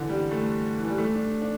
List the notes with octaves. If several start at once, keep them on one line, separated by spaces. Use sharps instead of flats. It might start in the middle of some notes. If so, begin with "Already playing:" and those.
Already playing: D3 E3
G3
A3
E3
G3
A3
D4
D4